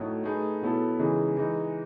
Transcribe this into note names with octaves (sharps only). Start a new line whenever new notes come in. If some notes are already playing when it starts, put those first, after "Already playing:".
Already playing: A2 F#3 A3 D#4
A3 D#4 G#4 B4
B2 F#3 B3 E4 A4
C#3 E3 G#3 D#4 G#4
E3 G#3 D#4